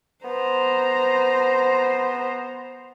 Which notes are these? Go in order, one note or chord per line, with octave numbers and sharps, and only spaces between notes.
B3 C5 A#5